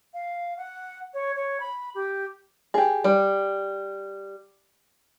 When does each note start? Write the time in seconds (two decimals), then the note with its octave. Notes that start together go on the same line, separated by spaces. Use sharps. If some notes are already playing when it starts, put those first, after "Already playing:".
0.14 F5
0.57 F#5
1.14 C#5
1.36 C#5
1.60 B5
1.95 G4
2.74 G4 G#4
3.04 G3